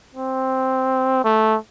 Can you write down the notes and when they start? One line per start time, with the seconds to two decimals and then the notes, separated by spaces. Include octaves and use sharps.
0.15 C4
1.24 A3